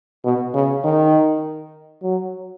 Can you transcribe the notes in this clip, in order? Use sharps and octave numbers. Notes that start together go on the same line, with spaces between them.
B2
C#3
D#3
F#3